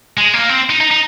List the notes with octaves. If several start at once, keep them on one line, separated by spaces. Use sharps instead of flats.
G#3
A#3
C4
D#4
D#4
D#4